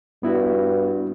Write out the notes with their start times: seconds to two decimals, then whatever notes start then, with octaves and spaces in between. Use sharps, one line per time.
0.23 G2 B3 E4 F#4